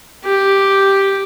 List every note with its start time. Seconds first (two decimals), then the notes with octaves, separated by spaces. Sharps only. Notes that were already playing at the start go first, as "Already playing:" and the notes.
0.25 G4